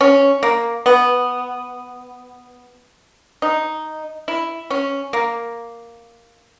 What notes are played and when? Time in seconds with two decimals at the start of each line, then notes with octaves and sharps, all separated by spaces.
0.01 C#4
0.43 A#3
0.86 B3
3.42 D#4
4.28 E4
4.70 C#4
5.13 A#3